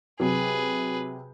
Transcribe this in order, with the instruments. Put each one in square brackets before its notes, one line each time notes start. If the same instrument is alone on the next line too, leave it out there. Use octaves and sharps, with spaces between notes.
[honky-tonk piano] C3 F#3 [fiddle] G#4 B4